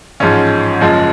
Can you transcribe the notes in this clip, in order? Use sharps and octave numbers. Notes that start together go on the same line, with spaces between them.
A1 G#2 F3 G#3 C#4
F#1 F#2 F3 G#3